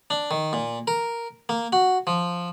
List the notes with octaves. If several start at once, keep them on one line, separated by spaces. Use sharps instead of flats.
D4
D#3
A#2
A#4
A#3
F#4
F3